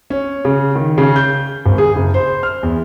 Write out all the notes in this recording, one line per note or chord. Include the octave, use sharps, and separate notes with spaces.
C#4
C#3
D#3
C#3
G6
G#1
G#4
F#1
C5
F6
E2